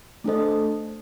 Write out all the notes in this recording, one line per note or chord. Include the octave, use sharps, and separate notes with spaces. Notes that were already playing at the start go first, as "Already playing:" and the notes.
A3 D4 A4 C5 D#5